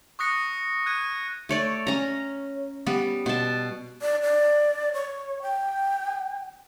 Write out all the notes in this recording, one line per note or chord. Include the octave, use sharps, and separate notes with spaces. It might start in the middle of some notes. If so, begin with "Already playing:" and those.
C#6 D#6 F#6 A#6 C#7
F#6 G#6 D#7
A3 C#5 D5
C#4 A#5
G3 B3
B2 A5
D5
D5
C#5
G5